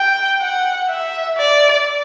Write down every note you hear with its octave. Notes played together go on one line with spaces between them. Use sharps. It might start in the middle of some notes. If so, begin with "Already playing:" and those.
Already playing: G5
F#5
E5
D5